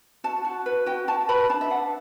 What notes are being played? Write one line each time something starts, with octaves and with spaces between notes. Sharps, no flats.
F#4 A5
F#4
B4
F#4 G5
F#4 A5
B4 B5
D4 A5
E5
D4 F#5